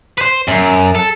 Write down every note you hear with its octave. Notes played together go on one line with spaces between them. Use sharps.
B4 C5
F#2
A4